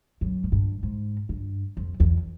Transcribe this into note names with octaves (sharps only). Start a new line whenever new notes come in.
F#2
G#2
G2
G#2
G2
F2
E2